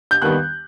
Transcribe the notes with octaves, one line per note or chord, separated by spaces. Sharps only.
G6
D#2 D#3 G3 B3 F#6